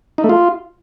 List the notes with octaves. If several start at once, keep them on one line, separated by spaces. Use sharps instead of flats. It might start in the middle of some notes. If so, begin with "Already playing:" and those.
D#4
A3
F4